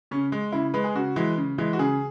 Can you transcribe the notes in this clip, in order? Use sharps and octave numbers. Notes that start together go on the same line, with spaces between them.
C#3 C#4
G#3
C#3 E4
G#3 B4
G#4
C#3 F#4
E3 G#3
C#3
E3 G#3
F#4
C#3 G#4